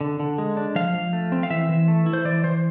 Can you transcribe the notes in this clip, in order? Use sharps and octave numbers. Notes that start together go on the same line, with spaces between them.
D3
D3
G#3
D4
F3 F5
F3
A3
C4
F5
E3 E5
E3
A3
E4
C5
E3 D5
E3 C5